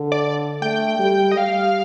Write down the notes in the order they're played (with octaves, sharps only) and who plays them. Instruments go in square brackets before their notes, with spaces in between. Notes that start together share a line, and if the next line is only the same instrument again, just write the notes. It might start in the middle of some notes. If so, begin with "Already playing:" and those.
Already playing: [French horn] D3
[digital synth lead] D5
[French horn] A3 [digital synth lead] G5
[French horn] G3
[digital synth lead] D#5
[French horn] G3 [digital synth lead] F5